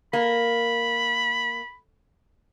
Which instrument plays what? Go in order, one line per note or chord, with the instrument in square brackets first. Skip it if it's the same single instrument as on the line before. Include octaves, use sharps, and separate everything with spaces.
[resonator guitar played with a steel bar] A#3 [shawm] B5